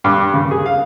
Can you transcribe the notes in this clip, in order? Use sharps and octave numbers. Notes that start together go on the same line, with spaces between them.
G2
C#3
G#4
F5